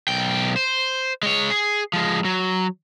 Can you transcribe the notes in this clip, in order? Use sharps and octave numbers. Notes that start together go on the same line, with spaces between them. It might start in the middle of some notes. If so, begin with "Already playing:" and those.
B1 G5
C5
G#3 C#5
G#4
F3 G#3
F#3